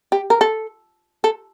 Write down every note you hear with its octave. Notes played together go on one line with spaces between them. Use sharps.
G4
A#4
A4
A4